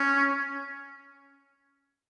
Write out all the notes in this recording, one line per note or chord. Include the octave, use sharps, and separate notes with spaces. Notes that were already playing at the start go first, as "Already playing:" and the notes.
Already playing: C#4